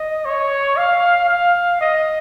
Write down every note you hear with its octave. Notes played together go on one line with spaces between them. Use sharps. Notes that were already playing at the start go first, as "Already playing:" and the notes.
Already playing: D#5
C#5
F5
F5
D#5